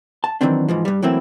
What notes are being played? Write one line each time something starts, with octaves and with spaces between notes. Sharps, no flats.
A5
D#3 E3 F#3 C4 D4
G#2 E3 F3
G2 G3
E3 F#3 A3 A#3 C4 E4